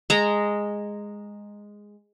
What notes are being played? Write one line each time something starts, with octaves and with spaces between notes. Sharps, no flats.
G#3 A#5